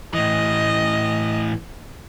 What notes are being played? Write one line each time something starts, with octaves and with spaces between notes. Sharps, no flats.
A2 E3 D#5